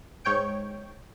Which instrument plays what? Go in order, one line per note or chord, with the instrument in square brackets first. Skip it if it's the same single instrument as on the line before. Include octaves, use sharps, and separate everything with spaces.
[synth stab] G#2 C#5 G5 G6 D7